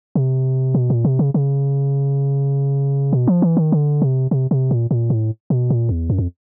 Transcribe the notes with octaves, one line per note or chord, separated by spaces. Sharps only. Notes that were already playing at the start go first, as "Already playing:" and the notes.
C3
B2
A#2
C3
C#3
C#3
B2
F3
E3
D#3
D3
C3
C3
C3
A#2
A#2
A2
B2
A#2
E2
F#2
F2